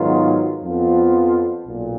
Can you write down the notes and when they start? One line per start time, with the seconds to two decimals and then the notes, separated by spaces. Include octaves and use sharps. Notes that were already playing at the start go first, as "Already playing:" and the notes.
Already playing: G#2 D#3 F#3 B3 F4
0.62 F2 F3 B3 F4
1.67 B1 A#2